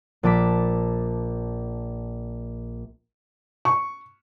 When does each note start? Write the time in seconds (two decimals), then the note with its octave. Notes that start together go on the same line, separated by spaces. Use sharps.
0.23 A#1 A5 D6 B6
3.65 C#6